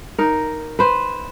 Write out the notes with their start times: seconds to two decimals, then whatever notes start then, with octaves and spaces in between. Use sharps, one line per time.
0.18 D#4 A#4
0.79 B4 C5